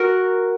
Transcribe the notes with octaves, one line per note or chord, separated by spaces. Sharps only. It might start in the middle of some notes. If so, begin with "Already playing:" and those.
Already playing: F#4 A#4